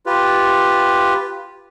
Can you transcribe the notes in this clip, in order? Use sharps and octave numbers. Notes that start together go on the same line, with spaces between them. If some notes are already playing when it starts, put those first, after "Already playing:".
F4 G4 B4